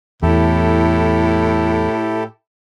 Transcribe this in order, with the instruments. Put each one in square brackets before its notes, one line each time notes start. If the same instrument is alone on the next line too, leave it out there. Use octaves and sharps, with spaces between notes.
[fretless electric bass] E2 [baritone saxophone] A2 [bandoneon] E4 G4 A4